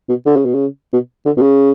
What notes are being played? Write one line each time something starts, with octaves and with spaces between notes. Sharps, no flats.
B2
D3
C#3
B2
C#3
B2
D3
B2
C#3